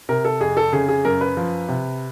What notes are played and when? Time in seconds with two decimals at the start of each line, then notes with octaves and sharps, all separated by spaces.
0.09 C3 A#4
0.25 A4
0.40 F2 G#4
0.57 A4
0.73 C#3 G#4
0.89 G#4
1.05 F#2 A#4
1.21 B4
1.37 F3
1.69 C3